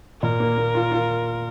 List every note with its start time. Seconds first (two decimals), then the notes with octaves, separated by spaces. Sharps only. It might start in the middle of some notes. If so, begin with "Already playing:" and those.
0.22 A#2 A#4
0.40 A#3
0.57 A#3
0.75 F4
0.92 F4